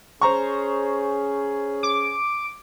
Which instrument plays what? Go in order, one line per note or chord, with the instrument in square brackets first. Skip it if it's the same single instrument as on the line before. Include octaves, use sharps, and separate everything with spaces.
[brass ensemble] C#4 G#4 [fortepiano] C5 A#5 C#6
[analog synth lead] D6